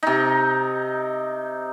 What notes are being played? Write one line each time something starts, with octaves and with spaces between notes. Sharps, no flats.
C3 D#4